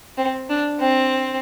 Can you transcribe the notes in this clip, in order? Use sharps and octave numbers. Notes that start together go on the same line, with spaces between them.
C4
D4
C4